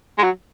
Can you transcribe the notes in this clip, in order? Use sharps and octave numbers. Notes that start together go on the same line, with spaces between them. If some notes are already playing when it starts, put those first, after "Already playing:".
G#3
F#3